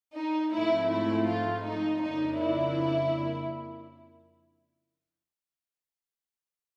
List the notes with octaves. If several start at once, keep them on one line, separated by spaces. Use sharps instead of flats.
D#4
G#2 F3 A3 C4 E4
E4
F4
D#4
F2 C#3 F3 A#3 D4 D#4
E4